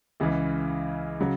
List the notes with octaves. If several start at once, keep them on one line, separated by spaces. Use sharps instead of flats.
C#2 C#3 E3
C#3 F#3